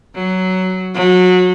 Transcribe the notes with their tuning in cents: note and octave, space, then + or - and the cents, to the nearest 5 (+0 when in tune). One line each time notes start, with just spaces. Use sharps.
F#3 +10
F#3 -25